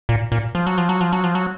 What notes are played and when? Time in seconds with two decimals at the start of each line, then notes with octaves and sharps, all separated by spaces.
0.09 A#2
0.32 A#2
0.55 F3
0.67 F#3
0.78 F3
0.89 F#3
1.01 F3
1.12 F#3
1.24 F3
1.35 F#3